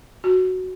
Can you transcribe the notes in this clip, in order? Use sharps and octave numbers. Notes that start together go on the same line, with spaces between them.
F#4